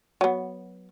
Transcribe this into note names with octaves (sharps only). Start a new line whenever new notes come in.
F#3 B3